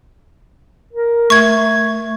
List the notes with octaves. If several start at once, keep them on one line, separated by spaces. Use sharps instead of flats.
A#4
A3 C#6 G#6